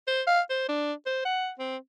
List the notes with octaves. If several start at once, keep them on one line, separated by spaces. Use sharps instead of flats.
C5
F5
C5
D4
C5
F#5
C4